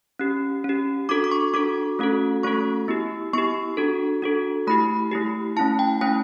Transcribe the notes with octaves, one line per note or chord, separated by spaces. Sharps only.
C#4 G4
C#4 G4
D4 F#4 A4 D6
D6
C#6
D4 F#4 A4 D6
A3 C#4 F#4 A4
A3 C#4 F#4 A4 C#6
B3 E4 G4
B3 E4 G4 C#6
D4 F#4 A4
D4 F#4 A4
A3 E4 G4 B5
A3 E4 G4
A3 C#4 E4 A5
G5
A3 C#4 E4 G5